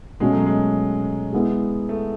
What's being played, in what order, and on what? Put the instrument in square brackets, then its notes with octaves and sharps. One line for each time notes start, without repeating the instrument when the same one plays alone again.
[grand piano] B2 A3 C#4 F#4 A4 [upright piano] G#3
[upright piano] F#3
G#3
[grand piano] G#3 B3 E4
[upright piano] A3